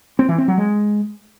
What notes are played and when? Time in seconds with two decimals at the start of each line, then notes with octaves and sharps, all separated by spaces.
0.19 C4
0.29 E3
0.38 C4
0.48 F#3
0.58 G#3